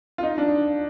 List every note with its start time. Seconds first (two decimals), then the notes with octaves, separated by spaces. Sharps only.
0.18 F4
0.23 D#4
0.38 D4